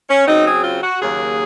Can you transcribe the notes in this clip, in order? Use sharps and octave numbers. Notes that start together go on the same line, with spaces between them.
C#4
C#3 F#3 C4 D#4
G#4
F4
F#4
D#2 C#3 F#3 A#3 G#4